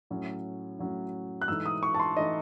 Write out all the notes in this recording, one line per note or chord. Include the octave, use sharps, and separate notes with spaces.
A2 F#3 C#4
A2 F#3 C#4
F#6
G#2 E3 A3 D#4 E6
D#6
C#6
A5
C6
E3 A3 D#4 D#5